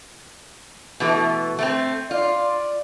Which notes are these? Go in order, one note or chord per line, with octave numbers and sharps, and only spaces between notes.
B2 E3 A3
A3 B3 C4
F4 D5